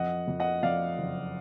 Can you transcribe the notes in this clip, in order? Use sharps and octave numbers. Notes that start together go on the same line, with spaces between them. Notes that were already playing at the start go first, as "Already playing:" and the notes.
Already playing: F2 D#5 F#5
F2
D#5 F#5
F2 D5 F5
F#1